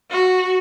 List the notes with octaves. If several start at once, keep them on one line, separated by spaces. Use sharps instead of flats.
F#4